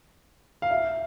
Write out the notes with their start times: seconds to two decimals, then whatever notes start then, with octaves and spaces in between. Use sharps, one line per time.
0.62 F5
0.71 E5